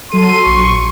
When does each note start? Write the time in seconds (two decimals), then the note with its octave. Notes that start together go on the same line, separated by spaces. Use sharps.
0.11 F#3 A4 C6 D#7
0.44 A#1 C#6